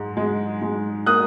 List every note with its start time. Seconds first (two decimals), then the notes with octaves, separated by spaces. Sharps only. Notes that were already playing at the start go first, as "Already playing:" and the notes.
Already playing: G#2 G#3
0.17 G#3
0.62 G#3
1.06 A#3 D#6 F#6